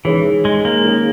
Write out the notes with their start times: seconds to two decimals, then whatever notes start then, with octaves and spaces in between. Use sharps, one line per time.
0.05 D#3 E3 G#3 C#4 G#4
0.45 G#3
0.65 A#3
0.84 D#3 G#3 C#4 G#4